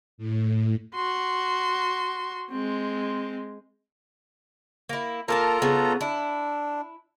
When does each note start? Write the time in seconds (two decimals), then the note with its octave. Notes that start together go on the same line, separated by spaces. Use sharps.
0.18 A2
0.95 F#4 C6
2.50 G#3 C4
4.89 A#3 E4
5.28 A#3 F4 A4 A#4 A5 A#5
5.62 C#3 B3
6.01 D4 E4